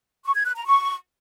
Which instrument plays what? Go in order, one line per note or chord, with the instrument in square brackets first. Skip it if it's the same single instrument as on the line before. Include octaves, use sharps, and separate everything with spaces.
[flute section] C#6
G#6
F#6
A#5
C#6